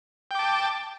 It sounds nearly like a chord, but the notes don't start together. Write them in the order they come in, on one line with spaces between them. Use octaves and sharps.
G5 D6 A5